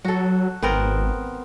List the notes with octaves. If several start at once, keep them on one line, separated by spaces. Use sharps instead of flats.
F#3 F#4 A4
G#1 B3 C4 A#4